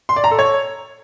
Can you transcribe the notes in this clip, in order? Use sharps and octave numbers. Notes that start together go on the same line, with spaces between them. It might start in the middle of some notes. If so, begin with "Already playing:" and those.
C6
D5
A#5
A4
C#5